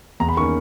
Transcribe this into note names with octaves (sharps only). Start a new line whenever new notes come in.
E2 A#5
B5
D#3 A#3 C#4 C#6